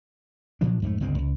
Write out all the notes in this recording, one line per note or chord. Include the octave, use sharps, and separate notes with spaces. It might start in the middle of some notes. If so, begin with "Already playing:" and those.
A#2 F3 F#3 D4
F2 G#2 G#3 A3
G1 C#2 G#3 C4
C#2